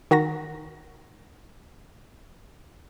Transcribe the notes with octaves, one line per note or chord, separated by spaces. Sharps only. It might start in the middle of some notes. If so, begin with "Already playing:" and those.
D#3 F#4 A#5 A#6